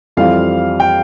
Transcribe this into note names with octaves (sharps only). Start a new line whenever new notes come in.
F2 E3 G3 C4 F4 F5
G5